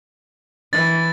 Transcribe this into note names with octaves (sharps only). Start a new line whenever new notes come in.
E3 A6